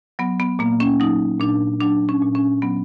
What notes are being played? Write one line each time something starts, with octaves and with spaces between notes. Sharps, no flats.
F#3 B3
B3
A#2 A#3
C#4
F#3 D#4
A#2 D4
F#3 D4
C#4
A#2
C#4
F#3 B3